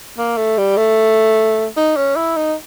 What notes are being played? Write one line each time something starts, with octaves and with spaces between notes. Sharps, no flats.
A#3
A3
G3
A3
D#4
C#4
E4
D#4